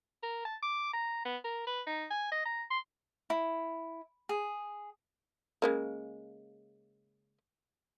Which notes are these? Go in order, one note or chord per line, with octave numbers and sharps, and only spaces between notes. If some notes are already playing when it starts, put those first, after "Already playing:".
A#4
A5
D6
A#5
B3
A#4
B4
D#4
G#5
D#5
A#5
C6
E4
G#4
C#3 G#3 A#3